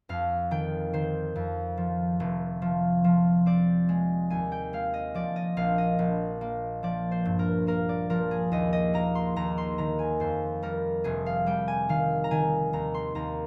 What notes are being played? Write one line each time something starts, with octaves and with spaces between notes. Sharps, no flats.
F2 F5
D#3 G5
D#3 C5
F2
F3
F1
F3
F3
C4 D5
G#3
D#2 G#5
G5
G#3 F5
D#5
F3 D5
D#5
A#1 F5
D#5
A#1
A#3
F3 D5
C5
G2
A#4
A#3 A#4
D5
F3 A#4
G#4
D#2 D#5
D#5
A#3 A#5
C6
D#2 A#5
C6
D#3 A#5
G#5
F2 C5
G3 A#4
F1 G#4
F5
G3 G5
G#5
D#3 F5
A#5
D#3 G#5
D#2 A#5
C6
D#2 A#5